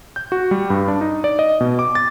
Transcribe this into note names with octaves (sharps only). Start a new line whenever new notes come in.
G6
F#4
G3
G2
D4
D#4
D5
D#5
B2
D6
A6